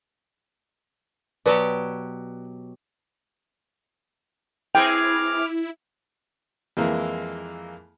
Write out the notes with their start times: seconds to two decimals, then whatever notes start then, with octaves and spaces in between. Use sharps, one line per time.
1.46 B2 F#3 G4 B4 D5
4.75 C4 E4 G#4 B4 G5 D6 F6
6.77 F2 E3 G#3 A#3 E4